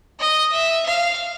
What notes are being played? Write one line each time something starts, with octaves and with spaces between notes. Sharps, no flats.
D#5
E5
F5